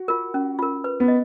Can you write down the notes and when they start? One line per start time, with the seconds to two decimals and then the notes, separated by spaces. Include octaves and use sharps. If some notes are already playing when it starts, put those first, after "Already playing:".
Already playing: F#4
0.08 F4 A#4
0.34 C#4
0.59 F4 A#4
0.84 B4
1.00 B3
1.08 D#5